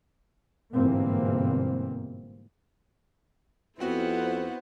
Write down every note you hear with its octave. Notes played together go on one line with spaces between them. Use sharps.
G1 G#2 B2 E3 A#3 C4
F2 B3 C4 E4 F#4 C5 F#5